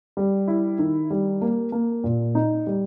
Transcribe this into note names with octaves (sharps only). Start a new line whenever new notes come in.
G3
E4
D#3
G3
A#3
A#3
A#2
D#4
G3